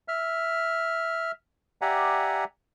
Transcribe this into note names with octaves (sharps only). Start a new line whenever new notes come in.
E5 F6
G4 D5 E5 F#5 G#5 A#5